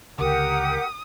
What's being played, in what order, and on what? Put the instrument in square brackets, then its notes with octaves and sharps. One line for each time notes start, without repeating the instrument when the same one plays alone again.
[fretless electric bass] C#2 D3 [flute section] G4 A#4 F#5 [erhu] D#6